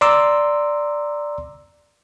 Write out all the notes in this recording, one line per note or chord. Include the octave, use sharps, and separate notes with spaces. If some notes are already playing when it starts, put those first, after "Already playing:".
D5 A#5 C6 D6 E6